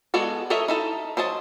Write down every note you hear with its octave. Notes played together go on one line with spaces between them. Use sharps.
G#3 B3 F#4 A4 D5
A4 A#4 C#5 D#5 E5
D#4 E4 A4
F#3 C5 D#5 A5